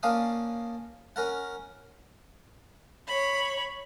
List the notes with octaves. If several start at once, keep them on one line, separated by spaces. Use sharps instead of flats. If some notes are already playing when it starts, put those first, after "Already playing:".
A#3 C#4 D4 F5 D#6
C#4 A#4 F#5
C#5 B5